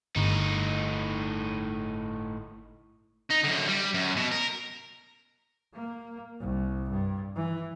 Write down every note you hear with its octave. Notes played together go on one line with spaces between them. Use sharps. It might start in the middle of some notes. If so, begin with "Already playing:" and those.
G1 A2 D#4
D#4
F#2 D3
G3
F#2
B2
A#4
A#3
C2
G2
E3